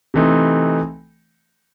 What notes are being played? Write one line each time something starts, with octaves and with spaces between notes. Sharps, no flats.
C3 E3 A3 C4 D#4